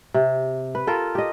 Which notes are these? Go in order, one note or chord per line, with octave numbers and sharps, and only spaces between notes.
C3
B4
F4 A4 A#4 G5
G4 D#5